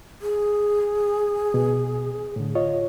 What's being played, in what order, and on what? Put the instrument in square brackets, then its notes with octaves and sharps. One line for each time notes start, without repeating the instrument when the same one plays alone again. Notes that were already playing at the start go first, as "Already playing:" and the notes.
[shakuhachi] G#4
[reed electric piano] B2
A2 D3
F4 C#5 D#5